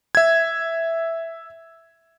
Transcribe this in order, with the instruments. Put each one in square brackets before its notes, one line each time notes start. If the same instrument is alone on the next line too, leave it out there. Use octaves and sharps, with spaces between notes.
[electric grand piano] E5 G#6